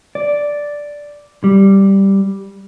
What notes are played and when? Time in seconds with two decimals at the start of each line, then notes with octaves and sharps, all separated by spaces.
0.15 D5
1.44 G3